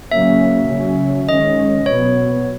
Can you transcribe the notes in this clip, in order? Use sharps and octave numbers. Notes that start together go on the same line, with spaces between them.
C#3 F#3 A#3 C#4 E5
C#3 F#3 C#4
D#3 G#3 C#4 D#5
B2 F#3 B3 C#5